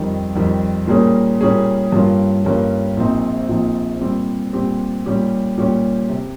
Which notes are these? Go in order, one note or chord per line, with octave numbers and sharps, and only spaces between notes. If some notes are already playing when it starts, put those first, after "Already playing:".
Already playing: F2 D#3 G3
F2 D#3 G3
A#2 G3 A#3 C#4 G#4
A#2 G3 A#3 C#4 G#4
G2 G3 A#3 C#4 F4
G2 G3 A#3 C#4 F4
A#1 A#2 F3 C4 D#4
A#1 A#2 F3 C4 D#4
A#2 G3 C4 G4
A#2 G3 C4 G4
A#2 G3 C#4 G4
A#2 G3 C#4 G4
C3